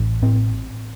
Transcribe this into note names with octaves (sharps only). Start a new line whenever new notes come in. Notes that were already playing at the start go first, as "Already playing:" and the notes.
Already playing: A1
A2 C4